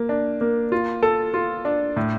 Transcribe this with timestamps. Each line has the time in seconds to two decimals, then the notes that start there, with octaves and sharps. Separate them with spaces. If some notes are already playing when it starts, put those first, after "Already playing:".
Already playing: A#3
0.09 D4
0.41 A#3
0.72 F4
1.03 A4
1.34 F4
1.65 D4
1.96 A2